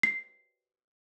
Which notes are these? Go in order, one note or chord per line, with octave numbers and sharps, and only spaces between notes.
C7